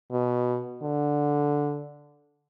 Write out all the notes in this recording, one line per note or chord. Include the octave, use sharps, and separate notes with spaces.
B2
D3